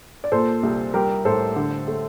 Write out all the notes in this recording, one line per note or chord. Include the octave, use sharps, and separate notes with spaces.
D5
A#2 A4 C5
C2
G3 G4 A#4
A2 A4 C5
D3
A3